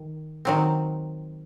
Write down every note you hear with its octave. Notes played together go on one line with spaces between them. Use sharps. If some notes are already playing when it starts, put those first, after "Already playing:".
Already playing: D#3
D#3 F#3 C4